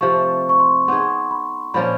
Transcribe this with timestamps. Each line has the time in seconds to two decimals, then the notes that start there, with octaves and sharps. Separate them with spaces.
0.01 C3 F3 A3 C#6
0.49 C#6
0.59 C6
0.88 B3 D#4 G#4 C6
1.31 B5
1.74 A#2 F3 A#3 C#4 B5